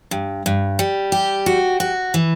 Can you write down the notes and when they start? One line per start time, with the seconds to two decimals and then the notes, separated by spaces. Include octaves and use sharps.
0.11 G2
0.46 G2
0.79 G3
1.12 G4
1.46 F#4
1.80 F#4
2.14 E3